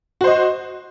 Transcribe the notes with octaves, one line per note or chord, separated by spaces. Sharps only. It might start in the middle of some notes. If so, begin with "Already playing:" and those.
F#4 C5 D#5